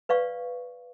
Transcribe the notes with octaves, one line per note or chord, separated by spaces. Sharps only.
B4 D5 F5 C#6